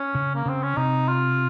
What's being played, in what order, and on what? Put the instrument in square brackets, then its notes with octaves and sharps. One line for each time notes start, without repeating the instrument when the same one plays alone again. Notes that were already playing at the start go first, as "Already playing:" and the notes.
Already playing: [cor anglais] C#4
[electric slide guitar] C#3
[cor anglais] A#3
[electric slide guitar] C#3 [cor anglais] C4
[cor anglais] C#4
[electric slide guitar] C3 [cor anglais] D#4
[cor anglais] F4